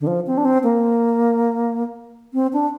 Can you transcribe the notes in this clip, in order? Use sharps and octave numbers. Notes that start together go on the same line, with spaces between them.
D3
F3
C4
D4
C4
A#3
C4
D4